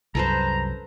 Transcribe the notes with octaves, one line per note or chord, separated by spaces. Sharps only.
C2 F#2 A4 B4 C5 A#5